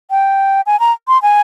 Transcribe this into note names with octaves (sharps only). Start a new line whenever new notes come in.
G5
G#5
A#5
C6
G#5